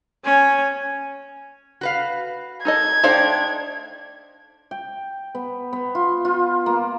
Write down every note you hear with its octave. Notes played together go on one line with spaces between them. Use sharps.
C#4 G#5
F#4 B4 F5
D#4 A4 D#5 G#6
A3 D4 D#4 C5 F5 G5
G5
B3
B3
F4
F4
A#3